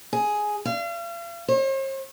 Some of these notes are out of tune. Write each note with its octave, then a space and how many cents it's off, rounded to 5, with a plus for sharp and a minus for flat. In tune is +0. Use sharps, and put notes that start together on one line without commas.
G#4 +5
F5 -40
C5 +45